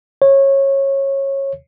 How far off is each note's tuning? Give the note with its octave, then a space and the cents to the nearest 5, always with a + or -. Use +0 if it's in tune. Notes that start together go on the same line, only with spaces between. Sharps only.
C#5 -20